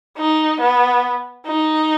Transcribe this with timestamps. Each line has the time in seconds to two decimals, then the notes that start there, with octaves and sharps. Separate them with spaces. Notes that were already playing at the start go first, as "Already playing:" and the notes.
0.17 D#4
0.61 B3
1.47 D#4